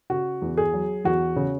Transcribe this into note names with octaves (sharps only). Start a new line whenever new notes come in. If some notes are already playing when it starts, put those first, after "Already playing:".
C#3 F#4
E2
G#4
F#3
E2 F#4
C#3